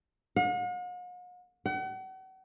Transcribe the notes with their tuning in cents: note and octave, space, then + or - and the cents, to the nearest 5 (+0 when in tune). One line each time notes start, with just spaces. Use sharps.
F#5 -45
F#5 +40